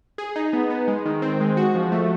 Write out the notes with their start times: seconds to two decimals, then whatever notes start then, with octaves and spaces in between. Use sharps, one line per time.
0.18 G#4
0.36 D#4
0.53 B3
0.70 B3
0.88 G#3
1.05 D#3
1.22 C4
1.41 G#3
1.57 F#4
1.75 F3
1.92 A3